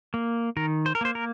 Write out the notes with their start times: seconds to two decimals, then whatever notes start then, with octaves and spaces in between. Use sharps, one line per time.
0.14 A#3
0.57 D#3 A#4
0.86 C5
0.95 A#4
1.01 A#3 C5
1.15 A#4